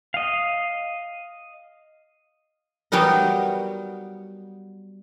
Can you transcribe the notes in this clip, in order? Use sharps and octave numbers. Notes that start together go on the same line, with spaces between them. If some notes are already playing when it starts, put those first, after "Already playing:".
D#5 F5
F#3 G3 B3 D#4 A#4